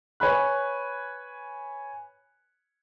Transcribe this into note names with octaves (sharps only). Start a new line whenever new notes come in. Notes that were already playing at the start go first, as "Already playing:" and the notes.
B4 C#5 G#5 B5 F#6